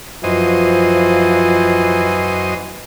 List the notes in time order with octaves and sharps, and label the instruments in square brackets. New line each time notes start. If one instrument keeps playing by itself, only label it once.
[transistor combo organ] F#2 C5 D#5 [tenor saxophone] E3 [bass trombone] F3